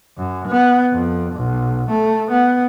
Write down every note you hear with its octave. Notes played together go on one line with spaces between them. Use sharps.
F#2
B3
F2
B1
A3
B3